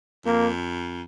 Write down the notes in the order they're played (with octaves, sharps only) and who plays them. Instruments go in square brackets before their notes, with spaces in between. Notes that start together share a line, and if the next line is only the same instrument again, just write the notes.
[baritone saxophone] F2 [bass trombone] A#3